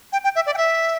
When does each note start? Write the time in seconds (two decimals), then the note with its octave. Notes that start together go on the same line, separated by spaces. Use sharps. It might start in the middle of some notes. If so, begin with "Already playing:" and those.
0.13 G5
0.24 G5
0.36 E5
0.46 D5
0.54 G5
0.57 E5